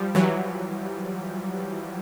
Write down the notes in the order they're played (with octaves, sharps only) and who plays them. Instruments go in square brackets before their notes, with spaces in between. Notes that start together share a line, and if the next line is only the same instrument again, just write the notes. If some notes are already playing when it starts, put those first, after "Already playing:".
Already playing: [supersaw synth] F3 G3
E3 F#3